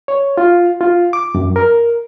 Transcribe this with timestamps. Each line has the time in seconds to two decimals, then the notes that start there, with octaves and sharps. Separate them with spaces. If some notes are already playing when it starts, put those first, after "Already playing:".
0.08 C#5
0.38 F4
0.81 F4
1.13 D6
1.35 F#2
1.56 A#4